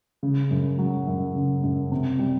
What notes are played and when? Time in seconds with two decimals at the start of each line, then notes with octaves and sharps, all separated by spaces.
0.23 C#3
0.50 F#2
0.79 F#3
1.07 F#2
1.35 C#3
1.63 F#2
1.92 C3
2.19 G3